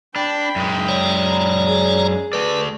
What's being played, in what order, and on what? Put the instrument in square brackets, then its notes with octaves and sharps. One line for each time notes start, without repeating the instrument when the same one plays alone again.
[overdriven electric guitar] D4 [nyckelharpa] G5 B5
[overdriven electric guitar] F#2 G#3
[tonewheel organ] C#5 D5 A#5
[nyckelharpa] G#4
[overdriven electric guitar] A3 D5 [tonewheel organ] B4